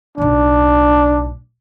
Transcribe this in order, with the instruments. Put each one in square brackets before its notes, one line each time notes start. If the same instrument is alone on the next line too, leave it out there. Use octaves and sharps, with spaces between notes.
[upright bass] B1 A2 [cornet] D4